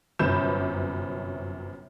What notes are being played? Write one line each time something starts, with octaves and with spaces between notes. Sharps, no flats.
G1 F#2 C3 B4 G6 E7